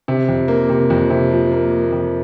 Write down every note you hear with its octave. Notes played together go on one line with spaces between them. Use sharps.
C3
F2
A#3
C3
F2
C3
F3
A#3
A#3
F2